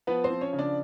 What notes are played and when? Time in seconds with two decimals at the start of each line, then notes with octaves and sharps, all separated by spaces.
0.07 F3 B3 B4
0.24 C4 C5
0.30 F3
0.41 C#4 C#5
0.53 C#3
0.59 D4 D5